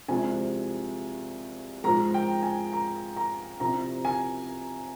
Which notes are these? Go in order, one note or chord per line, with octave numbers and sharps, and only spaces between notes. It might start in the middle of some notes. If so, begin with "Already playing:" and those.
C2 C3 F3 G#3 G#5
G#2 F3 G#3 A#5
G5
G#5
A#5
A#5
C2 C3 F3 A#5
G#5